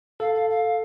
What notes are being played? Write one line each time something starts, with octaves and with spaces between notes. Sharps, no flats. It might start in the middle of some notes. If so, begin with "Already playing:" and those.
A4 F5
F5
F5